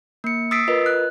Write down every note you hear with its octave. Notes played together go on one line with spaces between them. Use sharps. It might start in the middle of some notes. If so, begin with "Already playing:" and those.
A#3 C#7
D#6 E6 A6 B6 C7 D7
F4 A#4 B4 D#5
F#6